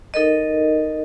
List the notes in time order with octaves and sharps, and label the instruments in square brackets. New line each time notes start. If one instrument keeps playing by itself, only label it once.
[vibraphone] D#4 A4 A#4 D#5